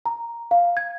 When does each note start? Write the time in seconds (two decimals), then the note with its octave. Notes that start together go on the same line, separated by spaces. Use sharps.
0.06 A#5
0.51 F5
0.77 G#6